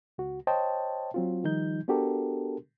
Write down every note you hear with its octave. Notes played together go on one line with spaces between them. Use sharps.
C#2 F#4
C5 C#5 D#5 G5 A5
F#3 C4 F4
D#3 F3 G3 D#4 G6
B3 D4 F#4 G4 A4 A#4